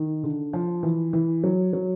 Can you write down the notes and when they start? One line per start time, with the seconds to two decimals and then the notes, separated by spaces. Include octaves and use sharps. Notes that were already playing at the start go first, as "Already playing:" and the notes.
Already playing: D#3
0.23 D3
0.53 F3
0.83 E3
1.13 E3
1.44 F#3
1.73 F#3